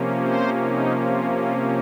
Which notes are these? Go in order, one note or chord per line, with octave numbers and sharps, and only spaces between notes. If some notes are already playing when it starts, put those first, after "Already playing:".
Already playing: C3 F3 A#3 C#4
C5
D#4
F4
F4